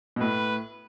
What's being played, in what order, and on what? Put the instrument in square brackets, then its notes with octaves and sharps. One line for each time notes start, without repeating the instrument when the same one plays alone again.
[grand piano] B2
[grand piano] A2 [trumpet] B4